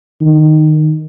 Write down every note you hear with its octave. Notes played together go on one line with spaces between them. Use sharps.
D#3